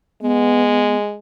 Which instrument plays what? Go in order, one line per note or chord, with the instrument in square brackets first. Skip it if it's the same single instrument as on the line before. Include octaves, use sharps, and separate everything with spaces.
[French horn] G#3 [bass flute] B3